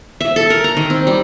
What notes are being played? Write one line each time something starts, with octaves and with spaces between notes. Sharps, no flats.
E5
A4
A#4
A#5
D#3
C4
G3